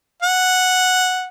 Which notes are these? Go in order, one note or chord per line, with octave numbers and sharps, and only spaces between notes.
F#5